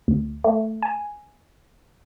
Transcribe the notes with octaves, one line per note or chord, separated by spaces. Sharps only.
D2
A3
G#5